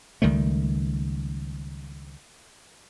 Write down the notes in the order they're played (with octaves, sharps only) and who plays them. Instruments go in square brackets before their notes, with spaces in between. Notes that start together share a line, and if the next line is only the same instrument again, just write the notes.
[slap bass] C#2 D#3 G3 A3